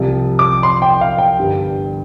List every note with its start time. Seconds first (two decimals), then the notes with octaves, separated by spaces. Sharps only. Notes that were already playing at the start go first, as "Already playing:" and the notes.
Already playing: C2 C3 F3
0.39 D6
0.63 C6
0.82 G5
1.01 F5
1.18 G5
1.38 G1 G2 G3